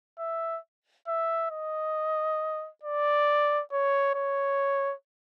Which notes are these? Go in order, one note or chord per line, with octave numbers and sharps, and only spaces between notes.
E5
E5
D#5
D5
C#5
C#5